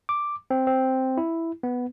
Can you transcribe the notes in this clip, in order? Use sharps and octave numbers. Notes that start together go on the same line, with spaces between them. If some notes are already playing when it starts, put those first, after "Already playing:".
D6
C4
C4
E4
B3